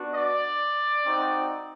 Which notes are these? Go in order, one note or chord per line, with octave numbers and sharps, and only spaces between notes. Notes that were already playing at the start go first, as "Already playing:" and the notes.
Already playing: B3 D4 F#4
D5
C4 D#4 F#4